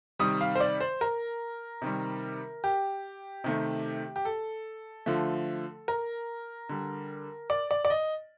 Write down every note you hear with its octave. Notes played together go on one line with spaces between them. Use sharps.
C3 D#3 G3 D#6
F5
C5
D5
C5
A#4
C3 D#3 G3
G4
C3 D#3 A3
G4
A4
D3 F3 A3
A#4
D3 G3
D5
D5
D5
D#5